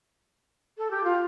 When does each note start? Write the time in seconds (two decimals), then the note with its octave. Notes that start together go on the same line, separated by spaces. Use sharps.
0.78 A4
0.91 G4
1.04 F4